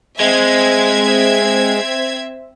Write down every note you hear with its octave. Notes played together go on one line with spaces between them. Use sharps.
G#3 C4 E5 G#6